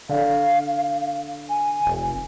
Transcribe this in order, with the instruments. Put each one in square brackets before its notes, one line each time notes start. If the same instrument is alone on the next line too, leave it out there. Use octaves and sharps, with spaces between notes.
[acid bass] D3 [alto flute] F5
[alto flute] G#5
[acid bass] F1